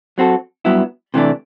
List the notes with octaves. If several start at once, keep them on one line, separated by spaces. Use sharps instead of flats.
F#3 C4 F#4 A4
G2 F#3 B3 E4
C3 E3 A3 D4